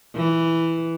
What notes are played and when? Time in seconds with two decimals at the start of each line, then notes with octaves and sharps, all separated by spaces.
0.16 E3